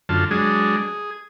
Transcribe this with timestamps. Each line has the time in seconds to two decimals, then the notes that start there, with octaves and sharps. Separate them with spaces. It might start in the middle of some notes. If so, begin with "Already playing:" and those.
0.09 F#2 D3 F4 A5
0.31 F#3 G#3 D4 G#4
0.77 G#4